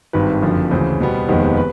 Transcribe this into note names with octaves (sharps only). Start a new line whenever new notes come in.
G#1 G2 D#3 B4
F#1 F2 D3 F3
D2 C#3 E3 C5
E2 B2 G3 B3
F1 D#2 D#3 G#3 B3 C5
B4